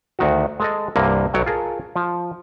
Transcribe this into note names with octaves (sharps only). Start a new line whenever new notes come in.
D2 D#3 F#4
G#3 A4 D#5
C2 G2 C3 A#3
B1 F#3 C#5 G5
F4 G#4 A#4 A5
F3